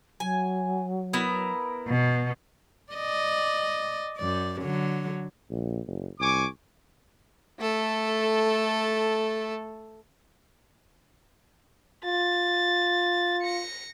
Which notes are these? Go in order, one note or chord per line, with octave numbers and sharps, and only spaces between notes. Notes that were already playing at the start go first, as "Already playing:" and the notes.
F#3 G#5
B3 E4 A#4
B2
D5 D#5
F#2 D5
D3 F#3
A#1
F#1
C2 G#5 C#6 D6
A3 A4
F4 A6
A#6 C#7